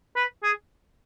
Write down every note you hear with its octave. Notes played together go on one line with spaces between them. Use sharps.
B4
G#4